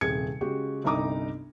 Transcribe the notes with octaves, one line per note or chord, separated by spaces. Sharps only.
D#1 C3 G#4 G#6 C#7
C#3 G#3 F#4 G4
G1 C2 D#4 A#5 D6 D#6